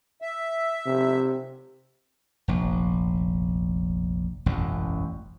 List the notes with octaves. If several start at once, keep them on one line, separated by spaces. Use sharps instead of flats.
E5
C3
F1 A#1
E1 A1 F#2